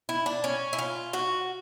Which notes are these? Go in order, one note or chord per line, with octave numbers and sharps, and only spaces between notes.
E4
D4
C#4
E4
F4
F#4